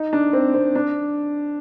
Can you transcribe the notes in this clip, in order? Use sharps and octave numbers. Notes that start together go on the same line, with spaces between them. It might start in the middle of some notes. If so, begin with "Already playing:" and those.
Already playing: D#4
D4
C4
C4
D4